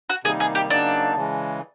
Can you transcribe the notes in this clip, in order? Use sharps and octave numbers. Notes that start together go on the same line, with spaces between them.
F#4
C3 D#3 G3 A#3 D#4 G#4
G#4
G4
C#3 F#3 A#3 D4 D#4
C#3 E3 G#3